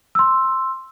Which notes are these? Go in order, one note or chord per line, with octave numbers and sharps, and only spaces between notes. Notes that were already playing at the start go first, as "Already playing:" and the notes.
C6 E6